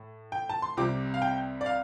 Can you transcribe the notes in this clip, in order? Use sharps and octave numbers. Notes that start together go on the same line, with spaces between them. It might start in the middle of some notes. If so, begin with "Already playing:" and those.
Already playing: A2
G5
A5
C6
C2 C3 G3 C4 D6
F5
G5
D5
F5